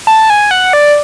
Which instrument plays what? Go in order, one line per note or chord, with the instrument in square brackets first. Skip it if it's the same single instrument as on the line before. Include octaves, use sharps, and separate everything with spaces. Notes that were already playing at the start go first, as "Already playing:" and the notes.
[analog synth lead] A5
G#5
F#5
D5